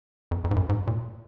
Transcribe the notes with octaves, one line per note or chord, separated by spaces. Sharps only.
F2
F2
G#2
F#2
G#2
A#2